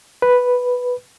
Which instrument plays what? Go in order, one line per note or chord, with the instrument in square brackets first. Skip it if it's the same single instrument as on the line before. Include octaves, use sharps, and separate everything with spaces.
[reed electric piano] B4